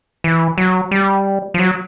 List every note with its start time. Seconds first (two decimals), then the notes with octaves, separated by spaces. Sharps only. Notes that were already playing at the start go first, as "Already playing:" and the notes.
0.24 E3
0.58 F#3
0.91 G3
1.54 F3
1.59 F#3